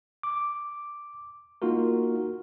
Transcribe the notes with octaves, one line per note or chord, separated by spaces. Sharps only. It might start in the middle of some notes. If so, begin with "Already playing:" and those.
D6
A#3 D#4 F4 F#4 A#4